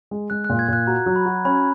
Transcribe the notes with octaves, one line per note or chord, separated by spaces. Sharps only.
G#3
G#3 F#6
F#6
A#2
G#6
A#2 F#6
F#4 A#5
F#3
B5
F#4
C#4 B5